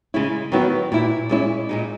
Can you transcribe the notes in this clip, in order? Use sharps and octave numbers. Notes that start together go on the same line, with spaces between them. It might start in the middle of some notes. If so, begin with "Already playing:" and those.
C#3 G#3 C#4 E4
D#3 F#3 B3 E4
A#2 A#3 E4
A#2 G#3 C#4 E4
A#2 G#3 D#4